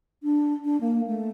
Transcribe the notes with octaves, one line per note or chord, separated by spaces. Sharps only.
D4
D4
A#3
A3